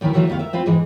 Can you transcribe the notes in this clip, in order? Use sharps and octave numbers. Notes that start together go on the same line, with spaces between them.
D2 D#3 F#3 D4 E4 A#4
D#3 E3 F#3 A3 F4
D2 D#3 B3 G4 F5
A#4 E5
C4 F4 B4
G#2 E3 G#3